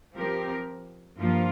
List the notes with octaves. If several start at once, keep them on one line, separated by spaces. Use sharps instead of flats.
F3 C4 G4 A#4
G2 F3 A#3 F4